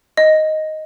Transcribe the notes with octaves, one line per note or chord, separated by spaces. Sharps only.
D#5